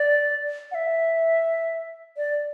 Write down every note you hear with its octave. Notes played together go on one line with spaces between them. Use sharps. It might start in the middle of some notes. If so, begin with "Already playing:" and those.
Already playing: D5
F#5
E5
D5